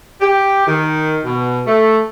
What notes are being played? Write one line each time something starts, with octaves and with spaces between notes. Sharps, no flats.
G4
D#3
B2
A3